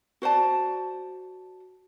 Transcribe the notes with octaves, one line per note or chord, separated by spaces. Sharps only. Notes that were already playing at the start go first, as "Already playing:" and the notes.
F#4 C5 D5 A5